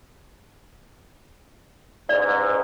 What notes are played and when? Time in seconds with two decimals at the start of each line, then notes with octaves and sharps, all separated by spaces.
2.09 A1 G#2 D5